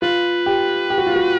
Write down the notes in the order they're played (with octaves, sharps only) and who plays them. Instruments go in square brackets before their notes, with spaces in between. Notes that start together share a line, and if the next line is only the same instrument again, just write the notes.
[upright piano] F4 [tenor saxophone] B4
[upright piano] G4
G4
F#4
F4
F#4